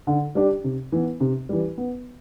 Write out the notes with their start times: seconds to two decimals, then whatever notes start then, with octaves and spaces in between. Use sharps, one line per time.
0.07 D3
0.35 G3 D4 G4
0.64 C3
0.92 E3 B3
1.20 C3
1.49 E3 G3
1.78 B3